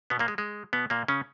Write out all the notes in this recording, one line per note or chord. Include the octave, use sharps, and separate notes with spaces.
B2 B3
A#2 A#3
G#3
G#3
B2 B3
A#2 A#3
C#3 C#4